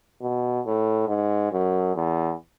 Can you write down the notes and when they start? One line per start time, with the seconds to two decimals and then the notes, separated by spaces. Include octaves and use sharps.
0.22 B2
0.65 A2
1.08 G#2
1.52 F#2
1.95 E2